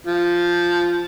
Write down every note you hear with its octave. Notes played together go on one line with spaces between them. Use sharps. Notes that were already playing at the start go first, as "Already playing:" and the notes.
F3